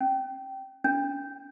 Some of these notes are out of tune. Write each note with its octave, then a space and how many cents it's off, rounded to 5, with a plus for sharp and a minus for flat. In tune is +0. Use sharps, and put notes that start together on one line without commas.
C#4 -30
C#4 +40